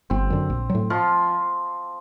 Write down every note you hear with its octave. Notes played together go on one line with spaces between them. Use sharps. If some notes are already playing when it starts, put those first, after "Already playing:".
G1 C4
F#2 D3
A#1
F#3
A2
F3 F4